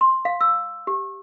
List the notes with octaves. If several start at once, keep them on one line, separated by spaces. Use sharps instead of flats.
C6
F5
E6
G4